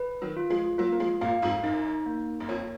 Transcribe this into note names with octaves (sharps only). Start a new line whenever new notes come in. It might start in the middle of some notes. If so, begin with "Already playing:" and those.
Already playing: B4
D#3 F#3
F4
F3 G#3
F#3 A#3 F4
A#3
F3 G#3
F#2 A#2 F5
F2 G#2
F#2 D#4
A#3
F#2
F2 C#5